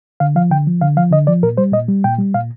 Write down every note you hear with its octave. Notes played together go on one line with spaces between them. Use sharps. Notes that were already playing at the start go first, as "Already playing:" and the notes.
D3 F5
F3 F5
D3 G5
F3
D3 F5
F3 F5
D3 D#5
F3 D5
A#2 A#4
G3 C5
A#2 D#5
G3
A#2 G5
G3
A#2 F5